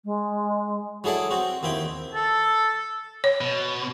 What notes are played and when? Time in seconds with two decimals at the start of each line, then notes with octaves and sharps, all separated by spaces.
0.04 G#3
1.04 F#3 E4 G#4 A4 D5
1.31 C4 F#4
1.63 D#2 C4 E4 G5
2.14 A4
3.24 C#5
3.41 B2